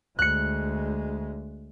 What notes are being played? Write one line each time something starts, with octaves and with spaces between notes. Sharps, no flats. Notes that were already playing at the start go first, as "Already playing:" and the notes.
D2 G#3 F#6 C#7